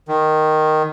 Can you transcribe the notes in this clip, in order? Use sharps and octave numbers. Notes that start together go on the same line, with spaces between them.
D#3